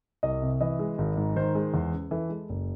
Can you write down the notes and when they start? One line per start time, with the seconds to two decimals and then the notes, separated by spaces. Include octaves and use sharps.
0.23 C2 D#5
0.42 C3
0.61 E3 D#5
0.79 G#3
0.98 G#1
1.17 G#2
1.36 D#3 C5
1.55 G#3
1.74 E2
1.93 C#3
2.11 E3 A4
2.30 G#3
2.49 F#1